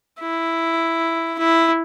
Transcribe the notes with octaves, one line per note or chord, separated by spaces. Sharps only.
E4
E4